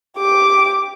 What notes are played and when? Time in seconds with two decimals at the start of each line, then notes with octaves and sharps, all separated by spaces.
0.17 G4 D6